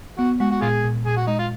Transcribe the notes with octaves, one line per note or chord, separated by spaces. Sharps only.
B3 F#4
G#3 F#4
F#4
A#2 F4 G#4
A#2
A#2 G#4
F#4
G#3 D#4
F4